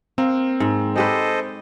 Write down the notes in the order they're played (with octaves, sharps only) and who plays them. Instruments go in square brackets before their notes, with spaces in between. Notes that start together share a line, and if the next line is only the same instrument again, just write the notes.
[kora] A#3 [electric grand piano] C4
[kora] G#2
[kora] G#3 G4 B4 [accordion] A4 C5 D#5